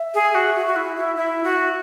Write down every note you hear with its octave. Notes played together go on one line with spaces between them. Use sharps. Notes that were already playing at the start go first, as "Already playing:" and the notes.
Already playing: E5
G#4
F#4
F#4
F#4
E4
E4
E4 E5
F#4